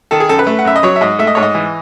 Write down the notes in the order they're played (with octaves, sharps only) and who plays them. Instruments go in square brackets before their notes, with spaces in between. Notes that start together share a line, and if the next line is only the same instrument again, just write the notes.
[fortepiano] D#3 A4
G#4
F#2 A4
B4
A3
F#5
F#2 E5
D#5
F#3 C#5
E5
G#2 D#5
A3 E5
D#5
G#2 C#5
D#5
E3